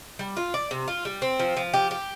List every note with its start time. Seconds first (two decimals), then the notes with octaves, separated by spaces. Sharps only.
0.19 G3
0.37 F4
0.54 D5
0.71 C3
0.88 F4
1.05 G3
1.22 C4
1.39 F3
1.57 F3
1.74 G4
1.91 G4